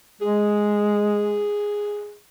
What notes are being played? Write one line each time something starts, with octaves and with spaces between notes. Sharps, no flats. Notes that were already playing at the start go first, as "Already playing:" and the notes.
G#3 G#4